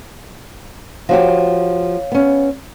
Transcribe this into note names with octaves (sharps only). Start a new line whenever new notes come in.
F3 F#4 G4 C#5 F5
B3 C#4